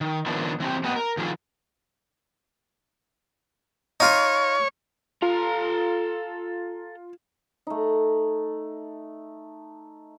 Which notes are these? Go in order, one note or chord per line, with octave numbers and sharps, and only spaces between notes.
D#3
D#3 F3 B3 D4 E4
E3 C4 G4
A3 B3 G4 D#5 F#5
A#4
D#3 F3 F4 G#4 A4
D#4 F4 C#5
F4 A4 A#5
A3 D#4